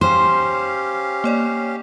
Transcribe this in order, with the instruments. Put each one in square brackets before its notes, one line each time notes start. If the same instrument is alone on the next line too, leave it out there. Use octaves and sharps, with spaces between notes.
[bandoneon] C#4 G4 F5 [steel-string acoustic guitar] C5 [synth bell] C#5
[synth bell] A#3 C#5 D5